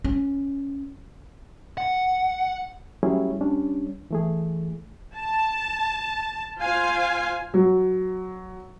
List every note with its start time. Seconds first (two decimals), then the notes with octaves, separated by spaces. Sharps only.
0.04 C#4
1.78 F#5
3.03 F#3 G3 A3 C#4 E4 G#4
3.41 G3 C#4 D4
4.11 E3 A3 G#4
5.15 A5
6.59 F4 C5 F5 G#5
7.54 F#3